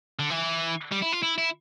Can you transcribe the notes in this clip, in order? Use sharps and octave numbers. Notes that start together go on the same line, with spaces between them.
D3
E3
G3
E4
F4
E4
E4